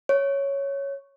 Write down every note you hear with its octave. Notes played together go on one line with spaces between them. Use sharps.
C#5